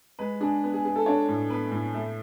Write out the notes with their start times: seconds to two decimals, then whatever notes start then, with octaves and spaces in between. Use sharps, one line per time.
0.19 G#3 B4
0.40 D4 G#4
0.63 B3
0.74 G#4
0.85 B3 G#4
0.96 A4
1.06 D4 C#5
1.29 A2
1.50 B3 B4
1.71 A2
1.94 A3